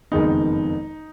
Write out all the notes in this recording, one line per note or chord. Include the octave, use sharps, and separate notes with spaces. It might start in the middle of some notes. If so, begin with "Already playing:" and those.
F#1 F2 D#3 G#3 B3 D#4